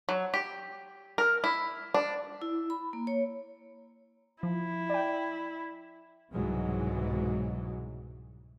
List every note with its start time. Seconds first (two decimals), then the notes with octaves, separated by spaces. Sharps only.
0.09 F#3
0.34 G4
1.18 A#4
1.44 E4
1.94 D4
2.42 E4
2.70 B5
2.93 A#3
3.07 C#5
4.43 F3 E4
4.90 D5 G5
6.34 C2 G#2 B2 E3 F#3 G#3